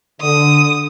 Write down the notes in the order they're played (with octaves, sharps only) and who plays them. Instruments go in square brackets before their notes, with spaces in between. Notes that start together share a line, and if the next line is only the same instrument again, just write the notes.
[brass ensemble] D3 [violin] D#6